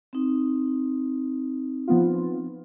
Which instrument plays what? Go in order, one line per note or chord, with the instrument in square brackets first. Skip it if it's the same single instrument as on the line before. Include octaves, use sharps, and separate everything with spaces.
[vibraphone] C4 D#4
[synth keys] F3 B3 F4